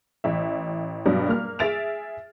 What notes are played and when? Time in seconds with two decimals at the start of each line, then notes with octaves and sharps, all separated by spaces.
0.24 A1 E5
1.06 G2 B2 F#3 B3 D4
1.28 A#3 F6
1.59 G#4 E5 A6 D7 F7